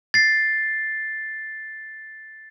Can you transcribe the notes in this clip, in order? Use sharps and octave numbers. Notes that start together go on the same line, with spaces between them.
A6 C7